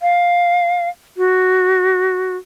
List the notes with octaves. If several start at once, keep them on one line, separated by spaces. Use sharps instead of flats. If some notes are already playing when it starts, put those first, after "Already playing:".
F5
F#4